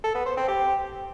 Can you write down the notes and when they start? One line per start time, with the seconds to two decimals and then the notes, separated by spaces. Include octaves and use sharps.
0.04 A4
0.15 B3
0.26 C5
0.37 C4
0.48 G4